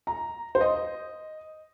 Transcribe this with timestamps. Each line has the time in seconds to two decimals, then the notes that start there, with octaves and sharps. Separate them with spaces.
0.07 A#5
0.55 C5
0.61 D#5